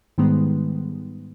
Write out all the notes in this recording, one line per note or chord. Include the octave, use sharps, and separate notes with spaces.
G#2 D#3 G3 G#3 B3